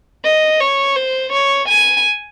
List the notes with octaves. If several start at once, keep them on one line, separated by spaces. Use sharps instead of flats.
D#5
C#5
C5
C#5
G#5